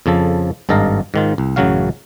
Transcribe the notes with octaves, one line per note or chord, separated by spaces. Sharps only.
F2 C#3 F3 A4
G#1 G2 A4 D#5 F5 A#5
G#2 D#3 F4
C2
A1 F#2 C#3 F#3 F#4 F5